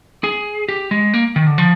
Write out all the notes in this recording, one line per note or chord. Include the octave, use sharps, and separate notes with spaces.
G#4
G4
G#3
A#3
D#3
D3
F3